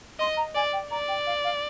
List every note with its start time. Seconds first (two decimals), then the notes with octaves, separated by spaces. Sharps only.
0.20 D#5 C6
0.37 A#5
0.55 D5 G#5
0.73 G5
0.91 D5 A#5
1.08 G5
1.26 F5
1.44 F5